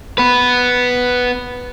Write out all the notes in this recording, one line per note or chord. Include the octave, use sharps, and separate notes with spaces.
B3 B4